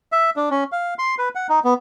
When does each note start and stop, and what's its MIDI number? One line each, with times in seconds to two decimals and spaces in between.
0.12 0.30 76
0.36 0.49 62
0.51 0.64 61
0.72 0.94 77
0.99 1.15 84
1.18 1.29 71
1.35 1.47 78
1.49 1.60 63
1.65 1.74 59